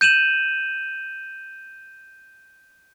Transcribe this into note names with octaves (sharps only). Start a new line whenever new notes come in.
G6 D#7 E7 F#7